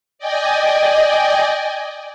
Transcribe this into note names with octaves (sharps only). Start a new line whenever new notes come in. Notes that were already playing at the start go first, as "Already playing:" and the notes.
D5 D#5 G5 G#5